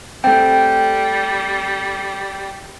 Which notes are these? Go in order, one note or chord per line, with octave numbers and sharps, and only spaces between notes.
G3 A3 C4 G5